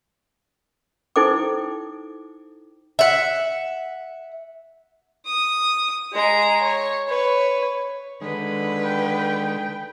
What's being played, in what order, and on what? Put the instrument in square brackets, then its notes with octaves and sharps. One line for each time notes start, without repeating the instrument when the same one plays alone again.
[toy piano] D#4 E4 A4 C5 G5 D6
[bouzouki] E5 F#5
[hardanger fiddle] D#6
G#3 A#5
C#5
B4 C#5
[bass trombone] D3 [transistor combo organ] D#3 G#3 [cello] B4
[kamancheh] G5